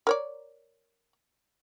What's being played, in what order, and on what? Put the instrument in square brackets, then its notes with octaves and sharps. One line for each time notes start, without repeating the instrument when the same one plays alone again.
[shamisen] A#4 C#5 D5